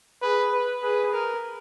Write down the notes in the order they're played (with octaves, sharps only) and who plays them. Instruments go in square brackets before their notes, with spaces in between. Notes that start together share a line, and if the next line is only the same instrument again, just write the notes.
[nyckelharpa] G#4 [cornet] B4
[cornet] B4
[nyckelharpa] G#4 [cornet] B4
[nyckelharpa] A#4